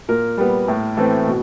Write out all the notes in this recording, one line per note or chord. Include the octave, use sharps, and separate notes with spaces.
A#2 A#4
G3 B3
A2
E3 A3 C4
B2